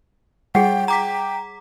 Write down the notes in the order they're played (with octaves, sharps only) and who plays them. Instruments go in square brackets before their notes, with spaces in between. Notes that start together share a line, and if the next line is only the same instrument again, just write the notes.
[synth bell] G3 [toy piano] G#4 F#5 [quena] G5
[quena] G5 [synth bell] A#5 D6 B6